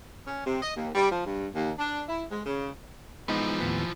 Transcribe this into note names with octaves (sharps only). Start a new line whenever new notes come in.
C#4
C3
D#5
D#2
G3
F3
G2
D#2
D4
E4
G#3
C#3
E3 F3 G#3 B3 D#4
D#2 A2 B3